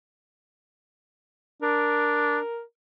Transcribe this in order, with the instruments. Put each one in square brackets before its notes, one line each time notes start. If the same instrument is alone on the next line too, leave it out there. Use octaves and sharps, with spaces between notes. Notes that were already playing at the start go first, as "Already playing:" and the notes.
[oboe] D4 [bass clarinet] A#4